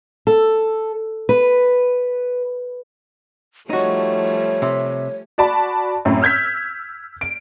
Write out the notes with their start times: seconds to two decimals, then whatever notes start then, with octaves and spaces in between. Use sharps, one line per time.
0.27 A4
1.29 B4
3.70 F3 G3 A3 D#4 F#4 C#5
4.62 C3
5.38 F#4 D5 A5 B5
6.05 F#2 A2 C4
6.22 E6 F6 G6 G#6 B6
7.21 D7